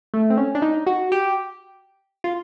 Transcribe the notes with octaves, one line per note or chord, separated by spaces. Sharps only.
A3
C4
C#4
D4
D#4
F#4
G4
F4